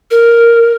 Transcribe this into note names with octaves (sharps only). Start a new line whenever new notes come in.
A#4